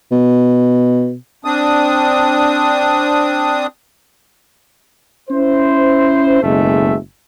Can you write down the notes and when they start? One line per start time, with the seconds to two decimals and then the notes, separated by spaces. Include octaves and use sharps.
0.11 B2
1.45 C4 D4 D#6
5.30 C#4 E4 C5
6.43 F#1 B2 G#3 A3 E5